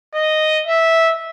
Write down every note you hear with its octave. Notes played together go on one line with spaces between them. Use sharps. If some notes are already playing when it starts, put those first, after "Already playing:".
D#5
E5